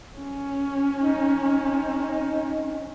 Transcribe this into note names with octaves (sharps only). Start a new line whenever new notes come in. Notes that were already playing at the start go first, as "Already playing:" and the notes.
C#4
D#4